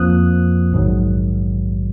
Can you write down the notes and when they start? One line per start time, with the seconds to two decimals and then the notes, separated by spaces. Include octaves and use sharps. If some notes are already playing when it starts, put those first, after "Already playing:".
Already playing: F2 F3 A#3 D#6 F#6
0.72 A#1 G#2 D#3 F#3